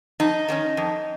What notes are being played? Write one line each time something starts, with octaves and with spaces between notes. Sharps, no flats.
F2 D#4
D#3 A#3 C#4
F2